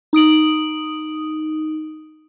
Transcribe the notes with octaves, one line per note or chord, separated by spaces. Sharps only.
D#4 D#6 D7 F#7